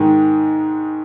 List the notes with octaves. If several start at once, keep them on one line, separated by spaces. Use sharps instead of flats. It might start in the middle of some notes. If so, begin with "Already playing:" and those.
Already playing: G#2 D#3 G#3